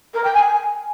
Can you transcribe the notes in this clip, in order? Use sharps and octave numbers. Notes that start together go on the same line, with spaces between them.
A#4
G5
G#5